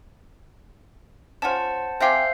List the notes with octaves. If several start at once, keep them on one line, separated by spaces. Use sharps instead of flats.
C#4 F4 C5 F#5 A5
C4 G4 C5 E5 F5 G#5